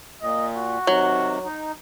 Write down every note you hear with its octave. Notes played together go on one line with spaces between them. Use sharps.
A#2 D#5
F#4
C3 D#3 F#3
D#4